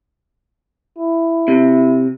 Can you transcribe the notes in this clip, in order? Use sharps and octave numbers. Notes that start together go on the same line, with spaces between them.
E4
C3